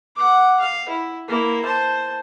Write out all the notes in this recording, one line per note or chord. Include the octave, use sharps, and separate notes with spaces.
F#5 D6
F5
E4
A#3 E4
C5 A5